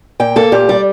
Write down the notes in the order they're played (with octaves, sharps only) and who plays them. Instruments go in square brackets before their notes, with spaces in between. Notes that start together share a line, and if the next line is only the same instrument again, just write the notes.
[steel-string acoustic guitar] A#2 G5
A#3 A4
A#2 G4
G3 D5